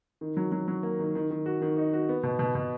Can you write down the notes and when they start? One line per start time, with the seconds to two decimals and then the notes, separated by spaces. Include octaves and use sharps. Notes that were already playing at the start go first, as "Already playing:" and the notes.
0.21 D#3
0.37 F#3
0.52 F#3
0.68 F#3
0.83 A#3
0.99 D#3
1.15 D#3
1.31 D#3
1.46 F#4
1.62 D#3
1.77 D#4
1.93 F#4
2.09 B3
2.23 B2
2.39 B2
2.55 B2